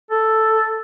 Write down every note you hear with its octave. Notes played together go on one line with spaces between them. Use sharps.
A4